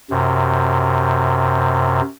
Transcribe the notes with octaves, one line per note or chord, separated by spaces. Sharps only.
F#2 C3